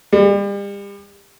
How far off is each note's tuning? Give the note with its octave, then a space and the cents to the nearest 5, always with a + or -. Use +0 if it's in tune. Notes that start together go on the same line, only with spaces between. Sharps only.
G3 +40